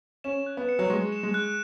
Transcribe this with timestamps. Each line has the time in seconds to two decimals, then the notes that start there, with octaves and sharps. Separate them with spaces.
0.24 C#4 E7
0.46 F#6
0.57 B3
0.69 C#7
0.79 F#3
0.90 G#3 C#6
1.12 E7
1.23 G#3
1.34 F#6